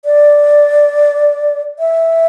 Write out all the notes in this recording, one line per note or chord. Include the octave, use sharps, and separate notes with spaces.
D5
E5